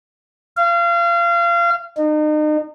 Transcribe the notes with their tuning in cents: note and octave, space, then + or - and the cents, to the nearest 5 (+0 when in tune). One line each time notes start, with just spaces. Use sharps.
F5 -30
D#4 -35